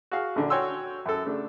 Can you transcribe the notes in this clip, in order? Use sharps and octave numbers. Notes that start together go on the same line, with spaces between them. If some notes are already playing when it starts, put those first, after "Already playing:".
F#4 G#4 F5
A#1 D3
F#4 C#5 G5 G#5 C6 E6
F#2 A4
C#3 A3 D4